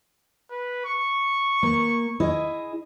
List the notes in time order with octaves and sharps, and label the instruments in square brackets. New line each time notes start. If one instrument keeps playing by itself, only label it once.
[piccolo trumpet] B4
C#6
[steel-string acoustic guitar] A#3
E4 G#4 D#5